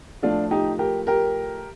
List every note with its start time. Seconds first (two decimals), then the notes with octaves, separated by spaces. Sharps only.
0.22 A2 F3 A3 D4 F4
0.51 D#4 G4
0.78 G4 A#4
1.07 G4 A#4